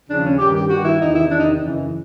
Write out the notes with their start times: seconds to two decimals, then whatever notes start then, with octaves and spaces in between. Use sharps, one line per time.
0.08 D#2 C#3 F3 D4
0.23 C#4
0.38 G2 D#3 G4
0.53 G4
0.69 G2 D#3 F#4
0.84 E4
0.99 E2 C3 D#3 D#4
1.14 E4
1.29 E2 C3 D#3 D4
1.39 D#4
1.60 F#2 C#3 E3